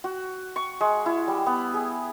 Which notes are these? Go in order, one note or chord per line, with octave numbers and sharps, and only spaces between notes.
F#4
C#6
G#3
E4
G3
B3
G#4